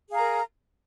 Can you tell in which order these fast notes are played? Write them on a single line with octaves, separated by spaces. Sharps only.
G#4 F5 A#5 A#4